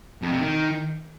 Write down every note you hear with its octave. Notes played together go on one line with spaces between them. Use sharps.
F2
C3
D#3